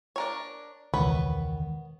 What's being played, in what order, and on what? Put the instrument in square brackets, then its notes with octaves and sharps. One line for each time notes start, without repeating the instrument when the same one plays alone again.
[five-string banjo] D4 A#4 C#5
[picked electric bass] E1 C#2 [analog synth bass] D#3 [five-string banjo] B3 B4 C#5